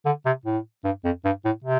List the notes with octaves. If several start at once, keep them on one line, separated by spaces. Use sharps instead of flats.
D3
C3
A2
G2
F2
G2
A2
C3